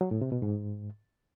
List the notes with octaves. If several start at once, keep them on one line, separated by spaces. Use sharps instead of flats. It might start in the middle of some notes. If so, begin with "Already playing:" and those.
F#3
A2
C3
B2
G#2